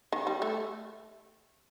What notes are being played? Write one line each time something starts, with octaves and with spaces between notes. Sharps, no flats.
D#3
G3
A3